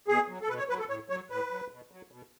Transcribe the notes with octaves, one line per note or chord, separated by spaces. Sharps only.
B2 G#4
F#3
A4
B2 B4
C#5
F#3 B4
A4
A2 C#5
F#3 C#5
A2 B4
F#3
B2
F#3
B2